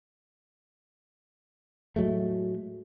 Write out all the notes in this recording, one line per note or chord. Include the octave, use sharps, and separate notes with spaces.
A2 F#3 G#3 A3